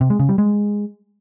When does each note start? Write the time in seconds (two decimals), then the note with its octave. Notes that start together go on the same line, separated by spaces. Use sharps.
0.01 C3
0.10 G#3
0.19 C#3
0.29 G3
0.38 G#3